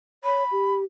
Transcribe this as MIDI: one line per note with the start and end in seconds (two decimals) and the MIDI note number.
0.24 0.44 73
0.24 0.74 83
0.51 0.84 67